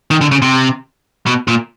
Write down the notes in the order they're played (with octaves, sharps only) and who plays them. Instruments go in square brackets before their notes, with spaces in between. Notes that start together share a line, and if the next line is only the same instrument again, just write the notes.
[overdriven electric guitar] D#3
D3
C#3
C3
B2
A#2